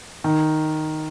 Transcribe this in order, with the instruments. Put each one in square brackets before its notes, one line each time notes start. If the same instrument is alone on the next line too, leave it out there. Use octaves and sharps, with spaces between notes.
[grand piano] D#3